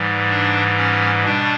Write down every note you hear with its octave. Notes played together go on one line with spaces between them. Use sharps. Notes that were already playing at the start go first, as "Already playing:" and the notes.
Already playing: G#2 E3 G3
D4
C#4
B2 G3 D4